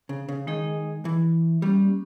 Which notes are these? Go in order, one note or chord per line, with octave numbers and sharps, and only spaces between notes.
C#3
C#3
D#3 G#3 D#4 G#4 D#5
E3
G3 A#3 C#4 G4